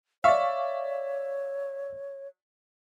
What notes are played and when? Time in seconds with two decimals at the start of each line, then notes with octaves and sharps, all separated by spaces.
0.24 C#5 D5 E5 F5 C#6